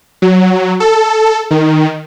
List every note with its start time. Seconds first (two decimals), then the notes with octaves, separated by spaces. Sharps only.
0.22 F#3
0.80 A4
1.51 D#3